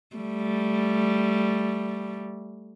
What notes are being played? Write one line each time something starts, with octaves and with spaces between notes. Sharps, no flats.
G3 A3